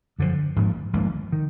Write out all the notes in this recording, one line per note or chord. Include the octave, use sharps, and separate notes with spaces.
F#2 D3 F3
G#1 G#2 F3 A#3
G#1 G#2 F3 A#3
D#3